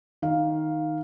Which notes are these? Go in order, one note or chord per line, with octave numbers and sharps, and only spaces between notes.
D#3 F5